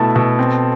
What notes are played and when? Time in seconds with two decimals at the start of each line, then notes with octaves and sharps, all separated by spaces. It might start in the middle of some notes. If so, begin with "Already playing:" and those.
Already playing: B2 A3 E4 A4
0.16 B2
0.39 C4